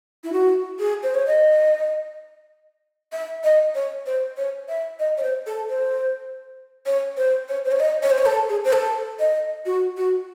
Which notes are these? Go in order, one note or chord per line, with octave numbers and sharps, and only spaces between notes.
E4
F#4
G#4
C5
C#5
D#5
E5
D#5
C#5
C5
C#5
E5
D#5
C#5
C5
A4
C5
C#5
C5
C#5
C5
C#5
D#5
C#5
C5
C#5
A4
G#4
C5
A4
D#5
F#4
F#4